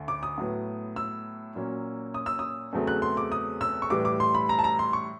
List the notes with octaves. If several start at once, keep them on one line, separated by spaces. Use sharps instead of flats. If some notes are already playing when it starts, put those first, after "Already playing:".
Already playing: D2 D3
D6
D#6
A2 F#3 B3
E6
A#2 F#3 A#3 C#4
D#6
E6
D#6
E2 C#3 F#3 A3 C4
F#6
C6
D6
D#6
E6
C#6
A2 E3 G3 D6
D6
C6
B5
A#5
A5
A#5
C6
C#6